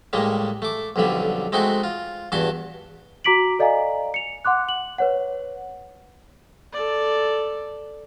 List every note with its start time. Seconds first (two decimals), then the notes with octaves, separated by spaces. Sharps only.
0.13 A2 G3 G#3 A#3
0.62 A3 D6
0.96 B1 F2 D3 G3 B5
1.52 G#3 A3 C4 D#4 F#4 G5
1.83 F4
2.32 E2 G2 F#4 A5 C6
3.24 F#4 A#5 D6 B6 D7 F#7
3.59 A4 D5 D#5 F5 G#5 A#5
4.14 C#7 F7
4.45 F#5 C6 D6 F#6
4.69 F#7
4.98 B4 C#5 F#5
6.73 A4 D5